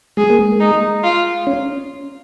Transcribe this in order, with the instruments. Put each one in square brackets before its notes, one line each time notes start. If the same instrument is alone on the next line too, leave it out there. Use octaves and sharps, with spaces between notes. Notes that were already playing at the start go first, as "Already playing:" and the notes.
[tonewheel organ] G#3 [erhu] G#4
[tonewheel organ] A#3
G#3
[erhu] D#4
F4
[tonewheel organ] C#4